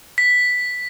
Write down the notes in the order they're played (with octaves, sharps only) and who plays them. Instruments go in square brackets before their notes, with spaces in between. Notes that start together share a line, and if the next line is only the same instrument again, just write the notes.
[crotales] B6